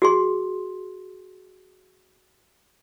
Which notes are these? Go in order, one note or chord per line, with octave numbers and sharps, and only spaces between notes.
F#4 G#4 C6